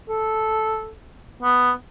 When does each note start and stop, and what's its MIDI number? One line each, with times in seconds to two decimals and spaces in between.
0.09 0.92 69
1.43 1.71 59